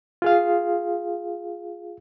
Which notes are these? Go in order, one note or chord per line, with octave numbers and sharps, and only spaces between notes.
F4 G#4 F5